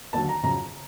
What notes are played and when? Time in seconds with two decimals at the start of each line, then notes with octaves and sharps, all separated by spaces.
0.13 D#2 D3 F#3 A5
0.29 A#5
0.43 F2 C#3 F#3 A#5